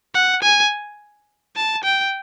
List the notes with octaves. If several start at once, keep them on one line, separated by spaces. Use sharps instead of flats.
F#5
G#5
A5
G5